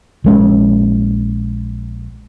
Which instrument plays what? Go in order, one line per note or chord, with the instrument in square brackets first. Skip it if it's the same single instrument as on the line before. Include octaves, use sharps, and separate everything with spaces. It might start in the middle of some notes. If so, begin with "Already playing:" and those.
[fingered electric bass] A#1 G#3 C#4